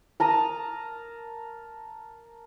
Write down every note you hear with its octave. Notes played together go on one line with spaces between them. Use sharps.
A#4 A5 A#5 D#6